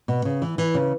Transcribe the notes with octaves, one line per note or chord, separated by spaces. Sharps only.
B2
C#3
E3
E3
C#3